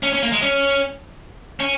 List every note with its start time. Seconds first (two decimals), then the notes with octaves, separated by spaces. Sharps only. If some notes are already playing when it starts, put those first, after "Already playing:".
0.03 C#4
0.13 C#4
0.23 A#3
0.32 G#3
0.42 C#4
1.60 C#4